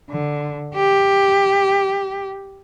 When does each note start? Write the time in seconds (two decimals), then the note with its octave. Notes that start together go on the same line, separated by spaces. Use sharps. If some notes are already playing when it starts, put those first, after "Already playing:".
0.10 D3
0.75 G4